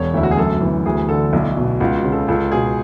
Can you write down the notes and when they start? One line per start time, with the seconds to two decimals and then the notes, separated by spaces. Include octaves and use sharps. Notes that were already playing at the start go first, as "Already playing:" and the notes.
Already playing: E1 C#5
0.14 D2 E4
0.23 F#4
0.31 G#4
0.37 F#2 A4
0.61 E3
0.85 D2 G#4
1.09 D3 A4
1.33 B1 E4
1.57 B2
1.80 C#2 F#4
1.96 F#4
2.04 C#3
2.12 A4
2.28 C#2 A4
2.52 B2 G#4